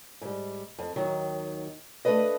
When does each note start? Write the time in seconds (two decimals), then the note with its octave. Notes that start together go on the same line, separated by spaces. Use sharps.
0.21 G#2 G3
0.79 F2
0.96 D#2 D#3 F#3
2.05 A3 D4 A4 B4 D#5